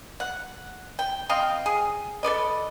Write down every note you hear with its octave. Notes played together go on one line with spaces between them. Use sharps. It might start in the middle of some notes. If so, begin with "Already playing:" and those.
F#5
G5
C4 D#5 F5 G5
G#4
A4 B4 D5 D#5